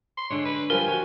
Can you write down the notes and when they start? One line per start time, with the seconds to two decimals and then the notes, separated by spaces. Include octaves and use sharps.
0.18 C6
0.30 D3 G#3 D4 C#5
0.45 B4
0.70 F3 G3 A#4 G#5
0.87 F#4 C#5